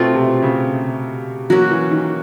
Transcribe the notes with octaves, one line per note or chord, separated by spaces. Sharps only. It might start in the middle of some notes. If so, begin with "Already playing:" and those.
Already playing: B2 A3 C4 F4
C3
C#3
F#3 A#3 C#4 F#4
E3
D#3